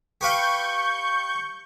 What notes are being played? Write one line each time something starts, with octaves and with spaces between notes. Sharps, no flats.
G4 B4 F5 C#6 G6